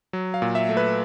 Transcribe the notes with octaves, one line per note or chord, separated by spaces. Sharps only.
F#3
F5
A#2
E5
A3
B4